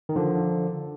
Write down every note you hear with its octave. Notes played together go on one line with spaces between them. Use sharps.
D#3
D3 F3